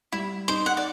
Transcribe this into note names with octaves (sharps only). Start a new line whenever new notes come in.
G3 E4
D#4 C5
F#5
D5